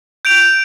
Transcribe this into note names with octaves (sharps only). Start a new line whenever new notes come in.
G6 D7 F7